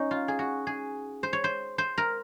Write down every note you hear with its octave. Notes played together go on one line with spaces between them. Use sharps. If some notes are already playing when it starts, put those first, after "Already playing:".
Already playing: C#4 D#4
F4
G#4
F#4
G#4
C5
C#5
C5
C5
A#4